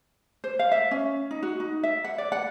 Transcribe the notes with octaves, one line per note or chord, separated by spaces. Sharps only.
C5
F5
E5
C#4
D#4
F#4
D#4
E5
F#5
D5
F#5